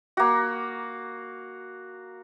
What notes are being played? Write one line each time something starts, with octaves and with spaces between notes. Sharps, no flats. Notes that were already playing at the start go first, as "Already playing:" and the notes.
A#3 F#4